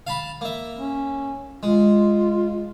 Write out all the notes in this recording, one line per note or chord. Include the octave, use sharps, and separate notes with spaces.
F5 A5 B5
A#3 E5
C#4
G#3 F4